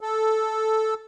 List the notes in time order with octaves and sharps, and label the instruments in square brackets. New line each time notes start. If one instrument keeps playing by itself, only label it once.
[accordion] A4